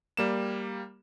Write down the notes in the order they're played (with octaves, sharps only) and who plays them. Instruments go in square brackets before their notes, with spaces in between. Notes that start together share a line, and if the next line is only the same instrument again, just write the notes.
[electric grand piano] G3 A#3 E7